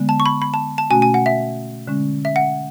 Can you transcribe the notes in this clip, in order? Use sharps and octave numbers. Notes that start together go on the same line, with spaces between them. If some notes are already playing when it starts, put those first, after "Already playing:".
Already playing: D3 G#3 B3
A5
C#6
B5
B5
A5
A5
B2 A3 C#4 F#4 G#5
G#5
F#5
E5
D3 G#3 C#4
E5
F#5